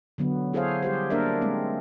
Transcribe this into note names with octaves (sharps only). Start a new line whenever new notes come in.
D3 F#3 B3
E4 G#4 A4 C5 C#5 F5
G3 G4 C5
A#3 D4 A#4 D5 E5
G#3 A3 C4